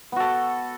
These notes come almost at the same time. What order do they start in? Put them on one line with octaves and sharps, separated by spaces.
B3 F#4 A4